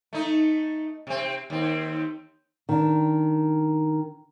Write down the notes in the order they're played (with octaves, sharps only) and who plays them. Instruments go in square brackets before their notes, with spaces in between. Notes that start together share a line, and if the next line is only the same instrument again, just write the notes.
[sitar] A3 D#4
C3 C4
D#2 C4
[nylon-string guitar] D#3 D4